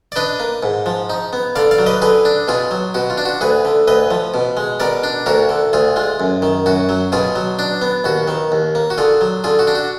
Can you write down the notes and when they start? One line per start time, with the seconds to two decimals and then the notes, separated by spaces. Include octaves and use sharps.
0.12 D5
0.16 D4 B4 D#5
0.40 A#3
0.63 G#2
0.86 F3
1.10 D#4
1.33 B3
1.56 D3 D5 F5
1.71 D5 F5
1.78 F#3
1.86 B4 D#5
2.02 D3 G#4 B4
2.25 D4
2.48 B2 F4 G#4
2.71 F#3
2.94 B2 F#4
3.10 F4
3.18 D4
3.26 F#4
3.41 D2 G#4 B4
3.65 D3
3.88 D2 B4 D#5
4.11 F3
4.34 B2
4.57 G#3
4.80 B2 A#4 D5
5.03 D4
5.26 D2 F#4 A#4
5.49 D3
5.73 D2 F4 G#4
5.96 G#3 F4
6.20 F#2
6.42 D#3
6.66 F#2 F#4
6.89 F#3
7.12 B2 F4 G#4
7.36 F#3
7.59 D4
7.82 B3
8.04 D#2 F#4
8.28 D#3
8.52 D#2
8.75 A#3
8.90 F#4
8.98 D3 F4 G#4
9.21 F#3
9.44 D3 F4 G#4
9.59 F#4
9.67 D4
9.75 F#4